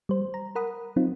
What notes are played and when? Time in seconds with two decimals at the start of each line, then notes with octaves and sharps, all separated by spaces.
0.09 G3 C5
0.34 A#5
0.55 A#4 F#5 B5 D#6
0.96 F#3 C4 D#4 F4